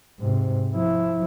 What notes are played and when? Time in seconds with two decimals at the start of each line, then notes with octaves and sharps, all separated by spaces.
0.20 G#2 C3
0.74 F3 E4